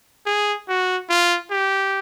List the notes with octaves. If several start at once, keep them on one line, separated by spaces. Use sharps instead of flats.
G#4
F#4
F4
G4